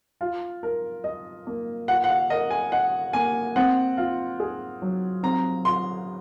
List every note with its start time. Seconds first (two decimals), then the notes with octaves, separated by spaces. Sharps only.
0.21 F4
0.63 A#4
1.04 D#5
1.47 A#3
1.88 F4 F#5
2.04 F#5
2.09 F5
2.30 A#4 D#5
2.51 G#5
2.72 D#5 F#5
3.13 A#3 G#5
3.56 C4 F#5
3.97 F4
4.40 G#4
4.82 F#3
5.23 C4 A#5
5.65 F4 C6